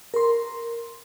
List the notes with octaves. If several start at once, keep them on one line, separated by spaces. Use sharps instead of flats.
A#4 C6